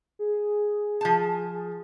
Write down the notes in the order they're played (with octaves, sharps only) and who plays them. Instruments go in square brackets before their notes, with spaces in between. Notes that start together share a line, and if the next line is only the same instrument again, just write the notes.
[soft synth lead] G#4
[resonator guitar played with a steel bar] F3 A5